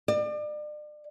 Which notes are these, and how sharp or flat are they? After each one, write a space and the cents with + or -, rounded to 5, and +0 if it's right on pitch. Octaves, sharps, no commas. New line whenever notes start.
D5 +35